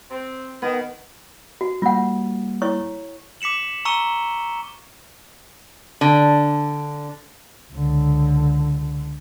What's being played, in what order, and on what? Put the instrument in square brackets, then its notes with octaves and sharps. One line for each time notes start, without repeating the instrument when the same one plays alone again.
[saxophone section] C4
[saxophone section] D#3 [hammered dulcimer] B3
[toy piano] F#4
[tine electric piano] G3 A#3 [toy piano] F4 F#5
[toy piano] E4 C#5 C#6
[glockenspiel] D6 B6 C#7 E7 F#7
A#5 C#6 E6 C#7 D#7 G7
[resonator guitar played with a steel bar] D3
[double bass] C#2 D3